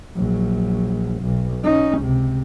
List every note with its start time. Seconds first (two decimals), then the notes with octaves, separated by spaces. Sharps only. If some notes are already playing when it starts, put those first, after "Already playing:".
0.16 A#1 F#3
1.22 B1
1.64 C#4 D#4
1.98 C#2 C3